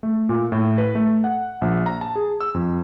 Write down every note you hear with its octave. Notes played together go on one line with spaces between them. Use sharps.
A3
A#2
A2
B4
A3
F#5
A#1
A#5
A5
G#4
E6
F2